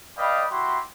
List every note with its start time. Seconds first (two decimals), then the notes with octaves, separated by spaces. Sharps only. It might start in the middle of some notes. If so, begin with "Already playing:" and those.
0.18 B4 D5 D#5 F5 G5 B5
0.51 E4 F#4 G4 C6